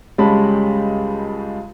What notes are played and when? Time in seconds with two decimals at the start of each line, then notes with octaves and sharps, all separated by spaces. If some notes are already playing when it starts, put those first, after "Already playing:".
0.18 C#2 G3 G#3 C#4 A5 B5